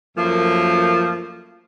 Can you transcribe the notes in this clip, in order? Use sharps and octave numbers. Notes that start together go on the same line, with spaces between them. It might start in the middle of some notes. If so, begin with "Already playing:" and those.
F#2 F3 A3 A#3